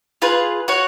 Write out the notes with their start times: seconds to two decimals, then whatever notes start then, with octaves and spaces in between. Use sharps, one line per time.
0.22 F4 G#4 B4
0.68 F#4 C#5 F#5